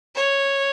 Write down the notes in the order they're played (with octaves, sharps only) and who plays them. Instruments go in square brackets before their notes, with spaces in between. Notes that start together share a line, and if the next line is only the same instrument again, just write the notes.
[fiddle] C#5